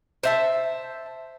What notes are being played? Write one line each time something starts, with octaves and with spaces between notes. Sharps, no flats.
C5 E5 A5